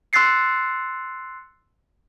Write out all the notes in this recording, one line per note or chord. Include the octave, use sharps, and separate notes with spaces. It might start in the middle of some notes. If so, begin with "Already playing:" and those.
C6 E6 F#6 A6 C7 C#7